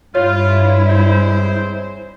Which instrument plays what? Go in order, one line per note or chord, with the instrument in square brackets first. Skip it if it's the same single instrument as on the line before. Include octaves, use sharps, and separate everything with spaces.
[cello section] G2 E4 [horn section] F4 [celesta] C#5
[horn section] G#3 C4 C5